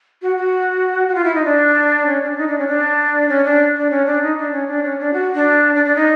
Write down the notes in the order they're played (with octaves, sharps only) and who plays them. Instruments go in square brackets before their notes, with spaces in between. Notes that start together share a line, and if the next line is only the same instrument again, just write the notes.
[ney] F#4
F#4
F#4
F4
E4
D#4
D4
C#4
D4
D#4
D4
C#4
D4
C#4
D4
D4
C#4
D4
D#4
D4
C#4
D4
C#4
D4
F#4
D4
D4
D4
D#4